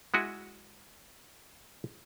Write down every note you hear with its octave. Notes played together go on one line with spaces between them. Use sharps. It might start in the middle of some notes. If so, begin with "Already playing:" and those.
G#3 E4 F#4 G#5